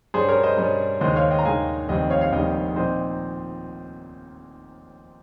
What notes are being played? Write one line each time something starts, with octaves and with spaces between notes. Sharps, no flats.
G2 G3 C#4 G#4 C5
A#4 C#5
C5 D#5
G2 G3 C#4
D#2 D#3 G#3 D#4 C5 D#5
C#5 F5
D#5 G5
A#5
D#2 D#3 G#3 D#4 F5 G#5
F1 D#2 D#3 G3 C4 D#5 G5
C#5 F5
C#5 F5
F1 D#2 D#3 G3 C4 D#5 G5
A#2 F3 C4 D#4 C5 D#5